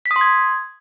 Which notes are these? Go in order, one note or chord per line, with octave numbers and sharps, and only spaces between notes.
B6
D#6
C6
G#6